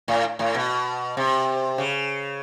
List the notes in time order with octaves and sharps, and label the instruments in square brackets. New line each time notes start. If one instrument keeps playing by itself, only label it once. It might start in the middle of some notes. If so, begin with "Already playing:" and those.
[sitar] A2
A2
B2
C3
C#3